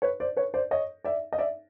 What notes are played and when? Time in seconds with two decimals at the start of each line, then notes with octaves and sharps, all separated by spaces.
0.02 B4 C#5
0.20 C5 D5
0.37 B4 C#5
0.54 C5 D5
0.71 C#5 D#5
1.04 D5 E5
1.33 D#5
1.38 D5 E5